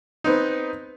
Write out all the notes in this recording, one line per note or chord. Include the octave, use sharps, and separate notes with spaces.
B3 C4 D#4